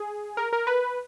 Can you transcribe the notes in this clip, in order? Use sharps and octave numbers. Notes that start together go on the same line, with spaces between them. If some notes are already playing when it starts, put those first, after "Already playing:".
Already playing: G#4
A#4
A#4
B4